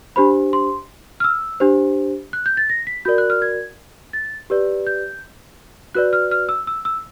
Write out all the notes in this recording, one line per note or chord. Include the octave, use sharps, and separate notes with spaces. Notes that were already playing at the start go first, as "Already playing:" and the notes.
D4 G4 C5 B5
C6
F6
E6
D4 G4 C5
F#6
G6
A6
A#6
B6
F#4 A#4 D5 G6
F#6
F6
G#6
A6
G4 B4 D5
G6
F#4 B4 D5 F#6
F6
F6
E6
E6
E6